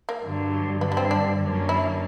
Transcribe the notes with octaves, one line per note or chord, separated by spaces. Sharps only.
A#3
G2 D3 F#3
G2 D3 G3 B3
B3
C4
D4
F#2 D3 F#3 A#3 C#4
E4